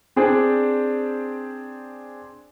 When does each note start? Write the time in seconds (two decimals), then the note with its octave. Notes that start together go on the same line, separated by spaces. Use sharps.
0.16 C4 D4 G#4 C5 D5